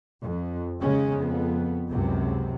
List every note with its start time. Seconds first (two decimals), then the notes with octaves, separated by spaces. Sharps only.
0.22 F2
0.80 D#2 C#3 G#3 C#4
1.19 F2 B3
1.90 C#2 F#2 C3